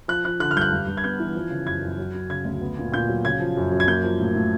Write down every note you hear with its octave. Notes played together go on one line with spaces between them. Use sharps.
F3 F#6
F3 F#6
D3 F#6
F6
G2 G6
F#6
G2
G2
G#6
B3 G6
E3
F3
C#3
F#2 G#6
F#2
F#3
F#3
C#3 G#6
D2
B3
A#2
A#2 G6
F#3
C#3 G#6
F3
F#2
F#2
G#6
A#3 G6
F3
A2
A2